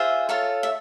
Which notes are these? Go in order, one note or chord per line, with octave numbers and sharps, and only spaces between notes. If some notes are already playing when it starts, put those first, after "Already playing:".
Already playing: F4 G#4 C5 E5
F4 A4 C#5
E5